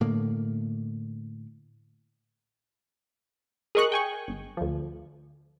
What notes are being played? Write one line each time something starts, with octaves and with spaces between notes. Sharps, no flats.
A2 D3 A#3
G#4 A#4 D#5 C#6 F#6
G5 G#5 C#6
G1
D2 F3